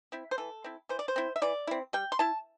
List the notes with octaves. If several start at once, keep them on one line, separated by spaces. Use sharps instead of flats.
C4 E4
C5
E3 A4
C4 E4
E3 C5
D5
C5
C4 E4
E5
E3 D5
C4 E4
G3 G5
C6
E4 A5